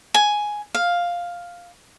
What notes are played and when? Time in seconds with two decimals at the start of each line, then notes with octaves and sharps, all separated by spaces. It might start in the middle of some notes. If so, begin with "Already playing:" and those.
0.14 G#5
0.75 F5